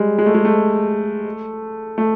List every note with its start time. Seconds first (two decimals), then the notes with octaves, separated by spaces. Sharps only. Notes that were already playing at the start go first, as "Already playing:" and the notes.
Already playing: G3 G#3
0.18 G#3
0.26 A3
0.34 G#3
0.45 A3
1.98 A3